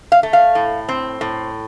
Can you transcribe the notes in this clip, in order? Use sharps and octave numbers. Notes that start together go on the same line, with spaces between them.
F5
A3
F5
A2
C4
A2